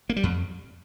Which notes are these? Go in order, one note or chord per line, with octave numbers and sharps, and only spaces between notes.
A#3
G3
F2